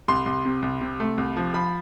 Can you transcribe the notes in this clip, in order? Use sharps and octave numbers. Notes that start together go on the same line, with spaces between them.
C2 C6
C2
C3
C2
C3
A3
C2
F3
F3 B5